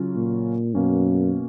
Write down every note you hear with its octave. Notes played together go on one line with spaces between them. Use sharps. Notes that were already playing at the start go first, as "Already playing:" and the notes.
Already playing: C#3 F#3 C#4 F4
A#2
F#2 B2 A#3 C#4